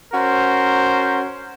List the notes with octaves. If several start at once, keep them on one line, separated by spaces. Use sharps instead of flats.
C#4 F#4 A#4 C5